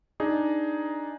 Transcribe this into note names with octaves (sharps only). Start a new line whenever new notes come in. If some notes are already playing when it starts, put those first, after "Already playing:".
D4 D#4 G#4 D5